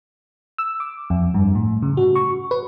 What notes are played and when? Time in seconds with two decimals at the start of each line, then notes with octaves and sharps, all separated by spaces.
0.58 E6
0.80 D6
1.10 F2
1.34 G2
1.55 A2
1.82 C#3
1.97 F#4
2.15 C#6
2.51 B4